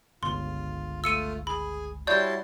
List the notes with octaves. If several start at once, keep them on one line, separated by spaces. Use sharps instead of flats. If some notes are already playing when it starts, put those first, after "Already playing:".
G1 C#2 F4 C6
A3 F4 E6 C#7 D#7
G#4 B5
G3 E4 F#4 C#5 D5 A5 C6 G6